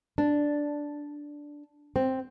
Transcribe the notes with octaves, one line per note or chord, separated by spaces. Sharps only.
D4
C4